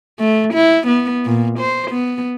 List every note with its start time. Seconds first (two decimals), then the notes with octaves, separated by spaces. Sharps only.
0.20 A3
0.54 E4
0.87 B3
1.25 A#2
1.59 C5
1.91 B3